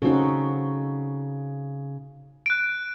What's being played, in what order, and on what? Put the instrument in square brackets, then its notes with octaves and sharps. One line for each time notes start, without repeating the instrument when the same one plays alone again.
[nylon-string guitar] C#3 C4 [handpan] D#4 F#4 A4
[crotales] F#6 D7